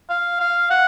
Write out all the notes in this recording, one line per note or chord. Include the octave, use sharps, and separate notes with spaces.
F5
F5
F#5